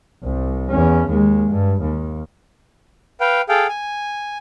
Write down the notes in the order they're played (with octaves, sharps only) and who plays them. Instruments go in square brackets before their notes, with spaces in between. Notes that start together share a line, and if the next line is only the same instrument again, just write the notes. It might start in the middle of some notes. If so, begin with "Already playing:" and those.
[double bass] C2
E2 C#4
D#2 G#3
G2
D#2
[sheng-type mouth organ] B4 F5 G5
G#4 A4 F5 G5
G#5